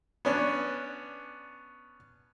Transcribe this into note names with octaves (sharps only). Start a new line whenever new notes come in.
B3 C#4 D4